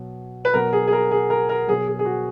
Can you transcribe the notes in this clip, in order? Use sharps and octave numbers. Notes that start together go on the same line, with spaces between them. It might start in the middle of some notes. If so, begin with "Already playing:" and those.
Already playing: B2 F#3
B4
B2 F#3 A#4
G#4
G#4
A#4
G#4
A#4
A#4
B2 F#3 G#4
G#4
G#4
F#4